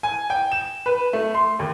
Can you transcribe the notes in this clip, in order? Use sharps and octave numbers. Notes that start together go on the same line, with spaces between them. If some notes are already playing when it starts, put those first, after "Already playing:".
G#5
G5
E7
B4
A3
C6
D#2